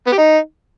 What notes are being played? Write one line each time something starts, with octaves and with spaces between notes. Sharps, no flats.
B3
G4
D#4